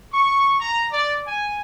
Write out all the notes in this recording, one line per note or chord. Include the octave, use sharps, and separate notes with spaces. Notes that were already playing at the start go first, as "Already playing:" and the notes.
C#6
A#5
D5
G#5